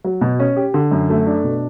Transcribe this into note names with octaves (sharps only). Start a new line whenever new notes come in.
F#3
B2
C#4
G4
D3
F#2
A3
D4
B2